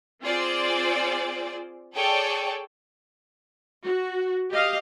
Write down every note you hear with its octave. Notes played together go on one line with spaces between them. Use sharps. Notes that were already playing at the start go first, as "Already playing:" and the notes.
C4 F4 G#4 C5 D5
G#4 A4 C#5 D5 G5 A5
F#4
G4 D#5 F5